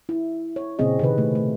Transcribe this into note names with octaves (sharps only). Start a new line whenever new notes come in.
E4
C#5
A#2 C#3 C4 G#4 D#5
C3 D#3 B4
A3
A3